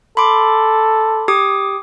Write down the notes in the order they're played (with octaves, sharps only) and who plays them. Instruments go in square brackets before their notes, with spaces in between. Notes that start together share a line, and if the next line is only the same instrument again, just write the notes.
[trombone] A4 [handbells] B5 C6 D6
[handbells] G4 D6 D#6